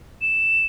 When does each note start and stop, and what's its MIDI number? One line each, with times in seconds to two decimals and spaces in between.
0.22 0.66 100